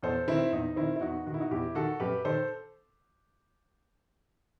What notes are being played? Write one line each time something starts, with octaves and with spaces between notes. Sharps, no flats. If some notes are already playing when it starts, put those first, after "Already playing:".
E2 A4 C5
D#3 C4 E4
E2 D#4
D#3 C4 E4
E4
E2 D#4 F#4
D#3 F#4
E4
D#4 F#4
E2 E4 G4
D#3 F#4 A4
F#2 G4 B4
D#3 A4 C5